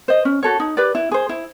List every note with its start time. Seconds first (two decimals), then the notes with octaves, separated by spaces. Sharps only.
0.08 C5 D#5
0.25 C#4
0.43 F#4 A4 C#5
0.60 D#4
0.77 G4 B4 D5
0.95 E4
1.12 G#4 C5
1.29 E4